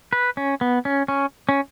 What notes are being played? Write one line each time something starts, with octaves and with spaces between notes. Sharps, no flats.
B4
C#4
B3
C#4
C#4
C#4